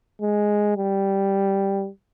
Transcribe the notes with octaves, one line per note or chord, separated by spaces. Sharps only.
G#3
G3